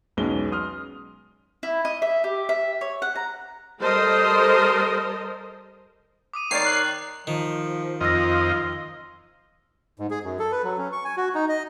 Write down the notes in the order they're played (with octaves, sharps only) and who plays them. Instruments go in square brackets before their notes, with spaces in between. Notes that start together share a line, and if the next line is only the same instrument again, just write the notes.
[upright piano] B1 E2 G#3 C#4 G7
C6 D#6 F6
[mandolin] E4
D#5
E5
G4
E5
C#5
F#5
A#5
[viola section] G3 A4 A#4 C5 D#5
[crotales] D6 D#6 D#7
[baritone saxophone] D#3 [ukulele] C#5 D5 [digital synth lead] C7
[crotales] F#6 F#7
[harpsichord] D#3 [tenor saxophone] F3
[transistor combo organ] F2 D#5 [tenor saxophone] F4 [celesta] C6 E6 A#6
[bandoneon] G#2
G#4
F#2
A4
B4
F#3
C#4
C#6
G#5
F#4
D#4
D#5